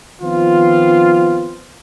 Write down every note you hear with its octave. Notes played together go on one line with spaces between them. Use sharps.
D#3 F3 B3 C4 F4